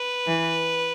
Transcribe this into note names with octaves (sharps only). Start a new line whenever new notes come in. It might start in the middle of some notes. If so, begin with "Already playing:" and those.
Already playing: B4
E3